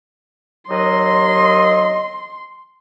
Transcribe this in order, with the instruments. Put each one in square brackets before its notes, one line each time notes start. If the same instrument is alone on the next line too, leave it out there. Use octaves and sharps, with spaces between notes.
[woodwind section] D#2 F#3 D#5 [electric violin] C6